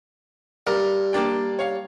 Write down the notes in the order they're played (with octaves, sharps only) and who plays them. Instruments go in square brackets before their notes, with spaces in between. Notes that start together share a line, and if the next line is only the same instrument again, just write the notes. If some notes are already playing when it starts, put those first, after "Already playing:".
[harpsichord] G2 [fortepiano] A#4
[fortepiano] A#3 D4 G5
C#5 F5